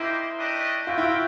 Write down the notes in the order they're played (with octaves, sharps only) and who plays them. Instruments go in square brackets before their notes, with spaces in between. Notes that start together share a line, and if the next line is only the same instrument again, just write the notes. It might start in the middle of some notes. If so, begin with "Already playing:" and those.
Already playing: [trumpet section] A#3 D#4 G4 C5 [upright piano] E4
[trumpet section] A3 D4 G4 B4 D#5
[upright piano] F4 [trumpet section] F#4 B4 E5 G5
[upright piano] E4
F4